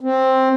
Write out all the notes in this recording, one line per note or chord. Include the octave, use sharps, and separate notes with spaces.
C4